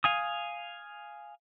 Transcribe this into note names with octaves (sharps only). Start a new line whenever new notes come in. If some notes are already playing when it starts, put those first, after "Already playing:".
F5 G#5 D#6